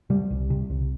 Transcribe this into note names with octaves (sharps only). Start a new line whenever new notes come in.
C3 G3
C2
C3
C2